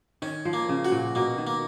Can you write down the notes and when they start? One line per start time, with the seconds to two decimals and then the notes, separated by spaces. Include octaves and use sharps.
0.22 D#3 C#4
0.45 F3
0.53 A#3
0.69 C#3
0.85 F#4
0.92 A#2
1.15 B2 A#3
1.38 D#3
1.47 A#3